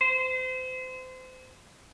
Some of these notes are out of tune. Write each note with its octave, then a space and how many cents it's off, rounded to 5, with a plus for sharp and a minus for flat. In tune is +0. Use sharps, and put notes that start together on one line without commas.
C5 -30